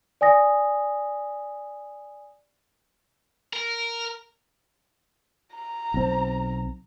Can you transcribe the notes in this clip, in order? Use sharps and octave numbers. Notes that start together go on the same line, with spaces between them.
D5 G#5 D#6 A#6
A#4
A#5
B1 C4